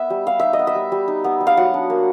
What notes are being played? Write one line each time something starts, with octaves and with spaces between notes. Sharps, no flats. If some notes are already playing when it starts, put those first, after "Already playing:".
Already playing: B3 E5
G3
G3 F5
D#4 E5
D#5
B3
E5
G3
G3
D#4
B3
G3
F5
F#3 F#5
D4
A#3